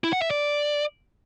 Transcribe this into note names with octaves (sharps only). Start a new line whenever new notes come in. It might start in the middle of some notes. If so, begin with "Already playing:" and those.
E4
F#5
E5
D5